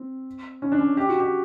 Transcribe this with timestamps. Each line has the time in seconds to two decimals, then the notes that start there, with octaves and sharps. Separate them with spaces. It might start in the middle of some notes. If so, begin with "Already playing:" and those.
Already playing: C4
0.62 C#4
0.72 D4
0.79 C#4
0.97 G4
1.09 F#4
1.20 G4